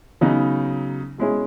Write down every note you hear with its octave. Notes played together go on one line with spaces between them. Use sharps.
C#3 F#3 B3 D#4
B2 G#3 C#4 E4 G#4